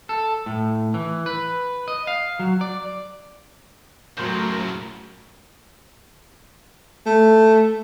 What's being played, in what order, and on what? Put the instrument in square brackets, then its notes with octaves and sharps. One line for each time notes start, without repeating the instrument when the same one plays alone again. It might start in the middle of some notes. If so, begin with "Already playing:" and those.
[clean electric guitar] A4
A2
E3
B4
D#5
F5
F#3
D5
[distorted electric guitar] A2 C#3 [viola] F#3 [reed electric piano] A3 C6 G6 [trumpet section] A#4
[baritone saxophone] A3